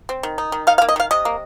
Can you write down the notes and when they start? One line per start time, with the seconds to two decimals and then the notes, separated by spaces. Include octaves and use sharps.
0.09 C4
0.23 D#3
0.38 D#4
0.52 D#3
0.67 D#4 F5
0.78 F5
0.82 A#3
0.89 D#5
0.96 D#3 F5
1.11 C3 D#5
1.25 A#3